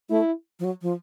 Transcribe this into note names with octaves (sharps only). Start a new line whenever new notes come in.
A3 E4
F3
F#3
F3